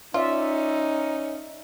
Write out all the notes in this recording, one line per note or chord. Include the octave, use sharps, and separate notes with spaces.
C#4 D#4 F4 D5 E5